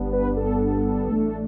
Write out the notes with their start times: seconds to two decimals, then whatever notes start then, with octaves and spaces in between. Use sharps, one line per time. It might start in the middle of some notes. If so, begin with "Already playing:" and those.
Already playing: G1 G2 G3 B3 D4
0.13 B4
0.36 A4
1.08 A1 A2 A3 D4